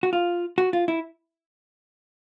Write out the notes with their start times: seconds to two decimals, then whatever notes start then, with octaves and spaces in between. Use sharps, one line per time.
0.03 F#4
0.13 F4
0.58 F#4
0.73 F4
0.88 E4